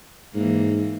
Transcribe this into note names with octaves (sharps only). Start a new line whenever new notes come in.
G#2 E3 A#3